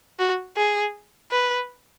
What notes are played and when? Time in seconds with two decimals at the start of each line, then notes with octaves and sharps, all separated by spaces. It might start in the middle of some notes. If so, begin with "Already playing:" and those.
0.19 F#4
0.57 G#4
1.31 B4